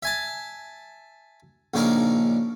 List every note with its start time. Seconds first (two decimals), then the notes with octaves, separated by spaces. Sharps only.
0.03 E5 G#5 A5
1.74 A#1 C#3 D4 D#4 A#4